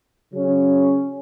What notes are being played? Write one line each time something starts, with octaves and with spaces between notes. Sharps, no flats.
C#3 F#3 C#4